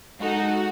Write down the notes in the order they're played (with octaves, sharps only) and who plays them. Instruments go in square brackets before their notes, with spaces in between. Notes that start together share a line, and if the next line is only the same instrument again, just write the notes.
[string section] G#3 D#4 A4 [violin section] F#4